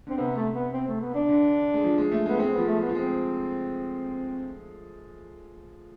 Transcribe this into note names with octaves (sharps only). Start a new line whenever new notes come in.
D3 C4
C3 B3
A3
B3
C4
A3
B3
D4
D3
G#3
F3
G#3
A3
G#3 B3
G#3 C4
F3 B3
A3
F3
B3
F3
G#3 C4